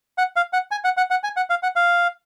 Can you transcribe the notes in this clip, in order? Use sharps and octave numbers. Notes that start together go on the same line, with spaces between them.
F#5
F5
F#5
G#5
F#5
F#5
F#5
G#5
F#5
F5
F#5
F5